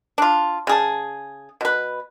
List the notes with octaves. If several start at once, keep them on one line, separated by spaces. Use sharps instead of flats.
D4 F4
C#3 G#4 A5
B2 B4